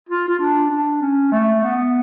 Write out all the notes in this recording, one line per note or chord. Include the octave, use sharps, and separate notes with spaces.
F4
F4
D4
D4
C#4
A3
B3